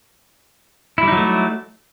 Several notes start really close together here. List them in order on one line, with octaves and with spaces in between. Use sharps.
E4 G3 D#4 F#3 A3